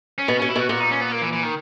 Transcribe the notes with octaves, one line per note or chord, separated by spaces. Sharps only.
C#4
B2 B3
B2 C#4
E4
B2 F#4
A#2 F#4
D#4
C#4
B3
A#3
E3
E3
D#3